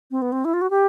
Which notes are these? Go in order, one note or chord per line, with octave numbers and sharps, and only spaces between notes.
C4
B3
C4
E4
F4
F#4
G4